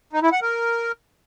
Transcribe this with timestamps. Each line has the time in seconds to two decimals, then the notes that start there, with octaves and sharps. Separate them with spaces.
0.13 D#4
0.23 E4
0.32 F#5
0.42 A#4